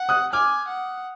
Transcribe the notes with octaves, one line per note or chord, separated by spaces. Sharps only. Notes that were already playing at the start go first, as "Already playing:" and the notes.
Already playing: F#5
D#6 F#6
G#5 D6 F6
F#5